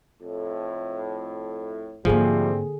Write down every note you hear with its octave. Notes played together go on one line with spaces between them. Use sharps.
F2 A2
G#2 D3 F3 G3 A3 A#3 C4 G#4